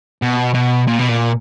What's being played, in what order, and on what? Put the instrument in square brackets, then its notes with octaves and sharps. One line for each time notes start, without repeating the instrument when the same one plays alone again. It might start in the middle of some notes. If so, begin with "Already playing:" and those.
[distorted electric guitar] B2
B2
A#2
B2
A#2